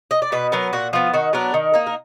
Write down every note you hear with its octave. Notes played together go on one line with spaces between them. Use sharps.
D#5
D5
B2 B4
F#3 B3 A#4
A#2 F#4
F3 B3 F4
D#3 F#4
F#3 B3 D4 A#4
D#3
A#3 D#4
A#4